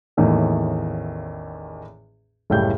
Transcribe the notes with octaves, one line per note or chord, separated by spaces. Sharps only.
A1 E2 A2 D#3 A#3
F#1 C#2 A2 G3 G5 G6